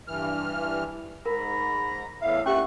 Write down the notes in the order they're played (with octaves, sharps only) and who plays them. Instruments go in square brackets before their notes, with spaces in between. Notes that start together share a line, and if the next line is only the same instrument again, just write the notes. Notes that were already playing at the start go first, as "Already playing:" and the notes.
[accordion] G2 E3 F6
[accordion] G#2 [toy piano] A#4 [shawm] A#5 [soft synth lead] B5
[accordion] E2 A2 F5 [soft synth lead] E5
[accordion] A#2 A3 F#6 [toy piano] C#4 G4 F#5 [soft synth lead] E5 [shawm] C#6